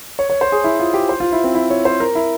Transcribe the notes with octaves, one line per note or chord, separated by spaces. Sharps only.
C#5
C#5
C5
G#4
E4
F4
G4
C5
F4
E4
C4
E4
C#5
C5
A#4
E4